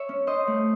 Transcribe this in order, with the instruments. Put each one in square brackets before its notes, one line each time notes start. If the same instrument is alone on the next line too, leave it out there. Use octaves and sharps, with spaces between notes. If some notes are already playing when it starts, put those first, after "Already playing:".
Already playing: [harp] C#5 E5
C#4
C#4 C5 D#5
A3